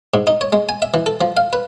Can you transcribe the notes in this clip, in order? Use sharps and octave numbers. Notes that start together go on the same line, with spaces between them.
G#2
D#4
C#5
G#3
G#5
E5
E3
A4
F3
F5
B4